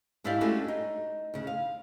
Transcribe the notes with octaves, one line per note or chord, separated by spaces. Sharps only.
G#2 D4 E4 G4 D5 F5
G#3 A3 C#4 D4 F#4 G4
D#4
D2 C#3
F5